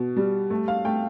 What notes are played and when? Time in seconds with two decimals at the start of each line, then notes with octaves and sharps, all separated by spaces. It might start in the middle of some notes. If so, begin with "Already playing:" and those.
Already playing: B2
0.17 G3
0.50 A3
0.68 F5
0.85 A3 G5